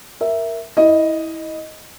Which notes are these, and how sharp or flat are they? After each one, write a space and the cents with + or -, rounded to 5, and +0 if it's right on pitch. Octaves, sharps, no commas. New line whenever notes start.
A#4 +0 E5 +0
E4 -20 D#5 +0